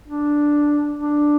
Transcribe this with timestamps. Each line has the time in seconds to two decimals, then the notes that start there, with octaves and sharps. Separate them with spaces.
0.08 D4
0.99 D4